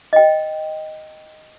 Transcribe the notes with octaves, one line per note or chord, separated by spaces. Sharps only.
D#5 G5